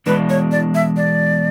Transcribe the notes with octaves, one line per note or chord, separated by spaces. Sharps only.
E2 B2 G#3 D4 B4
C#5
D5
E5
D5